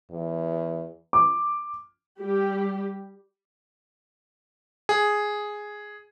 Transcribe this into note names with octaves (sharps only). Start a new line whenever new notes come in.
E2
D6
G3 G4
G#4